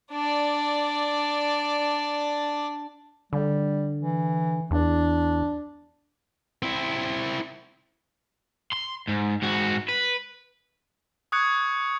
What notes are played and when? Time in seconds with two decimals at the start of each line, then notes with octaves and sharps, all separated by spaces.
0.12 D4 D5
3.33 D3 G3
3.99 E3
4.71 E2 D4
6.63 C4 E4
8.73 C6
9.09 G#2
9.43 G#2 F#4
9.89 B4
11.32 C#6 D#6 F#6 G#6 C#7